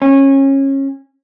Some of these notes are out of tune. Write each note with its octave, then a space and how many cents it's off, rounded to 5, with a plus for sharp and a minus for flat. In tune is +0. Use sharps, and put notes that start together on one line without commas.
C#4 -25